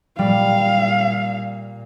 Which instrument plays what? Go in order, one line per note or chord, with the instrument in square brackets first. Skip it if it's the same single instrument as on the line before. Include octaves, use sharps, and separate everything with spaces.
[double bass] A#2 [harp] G3 [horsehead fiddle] F5